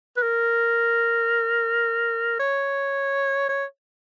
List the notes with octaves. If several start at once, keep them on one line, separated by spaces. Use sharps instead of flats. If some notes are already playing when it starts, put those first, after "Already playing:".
B4
A#4
C#5
C#5